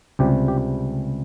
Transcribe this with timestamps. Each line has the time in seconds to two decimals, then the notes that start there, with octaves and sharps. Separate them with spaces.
0.19 C#2 C3 G3 G4
0.48 G4